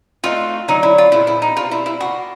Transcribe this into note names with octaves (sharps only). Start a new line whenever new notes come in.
A3 C4 D#4 F4 F#4
D3 F#3 A#3 D#4
E4
F4
A#2 F3 G#3 B3 E4
E4
D#4
B2 G3 C4 F4
E4
E4
A#3 D4 F4 F#4